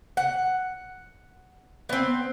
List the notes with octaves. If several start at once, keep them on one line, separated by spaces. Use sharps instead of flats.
F#5
B3 C4